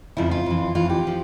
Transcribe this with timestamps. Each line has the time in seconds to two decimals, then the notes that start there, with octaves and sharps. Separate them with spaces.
0.17 F2 C#3 F3 E4
0.31 F4
0.46 F2 E3
0.75 F2 E3 F4
0.90 G4
1.07 F3